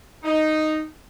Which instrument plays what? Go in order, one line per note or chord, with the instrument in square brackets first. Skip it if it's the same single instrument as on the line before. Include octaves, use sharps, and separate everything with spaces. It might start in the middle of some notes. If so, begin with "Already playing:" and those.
[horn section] D#4